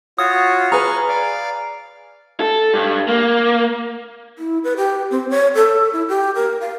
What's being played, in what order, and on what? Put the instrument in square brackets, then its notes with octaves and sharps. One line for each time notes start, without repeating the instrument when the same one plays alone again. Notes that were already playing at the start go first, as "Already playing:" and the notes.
[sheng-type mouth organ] F4 F#4 C#5 [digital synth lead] D#6
[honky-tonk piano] G#4 B4 [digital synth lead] A#5 [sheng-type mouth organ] C#6 F6
[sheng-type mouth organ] D5 F5
[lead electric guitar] A4
G2
A#3
[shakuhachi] E4
B4
G4
C4
C#5
A4
E4
G4
A#4
F5